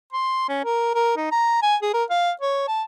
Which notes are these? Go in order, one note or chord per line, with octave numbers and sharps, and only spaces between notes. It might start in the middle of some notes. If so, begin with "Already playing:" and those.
C6
C#4
A#4
A#4
D#4
A#5
G#5
G#4
A#4
F5
C#5
A5